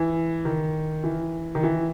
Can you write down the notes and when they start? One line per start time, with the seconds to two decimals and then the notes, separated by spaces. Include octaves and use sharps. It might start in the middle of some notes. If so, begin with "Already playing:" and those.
Already playing: E3
0.45 D#3
1.04 E3
1.55 D#3
1.63 E3